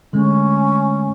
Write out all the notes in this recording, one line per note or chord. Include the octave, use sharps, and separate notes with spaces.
D3 G#3 A3 C#4